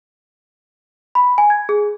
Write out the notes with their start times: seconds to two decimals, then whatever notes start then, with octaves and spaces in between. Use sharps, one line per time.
1.15 B5
1.38 G#5
1.50 G#6
1.69 G#4